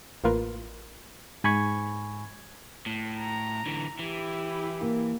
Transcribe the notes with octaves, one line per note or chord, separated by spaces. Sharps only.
A1 A2 A#3 F4 A#4 B4
G#2 G#5 B5 C#6 G#6
A2
A#5
D3 E3
E3 E4 G4
A#3